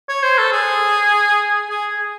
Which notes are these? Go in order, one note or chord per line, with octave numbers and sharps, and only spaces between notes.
C#5
C5
A4
G#4
G#4